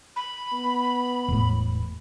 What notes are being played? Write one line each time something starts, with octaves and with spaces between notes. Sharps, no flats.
B5
B3
E1 A2